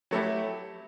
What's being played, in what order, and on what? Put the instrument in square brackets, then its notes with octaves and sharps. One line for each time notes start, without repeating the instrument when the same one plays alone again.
[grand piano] F#3 A3 E4 G4